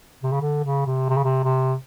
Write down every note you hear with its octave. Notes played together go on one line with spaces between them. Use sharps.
C3
C#3
D3
C#3
C3
C3
C#3
C3
C3